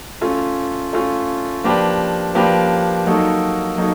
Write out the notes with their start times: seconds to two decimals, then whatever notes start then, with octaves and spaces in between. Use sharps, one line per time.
0.21 A3 C#4 F4
0.93 A3 C#4 F4
1.64 F3 A#3 D4 G4 B4
2.35 F3 A#3 D4 G4 B4
3.06 F#3 A#3 D#4 F#4 A4
3.78 F#3 A#3 D#4 A4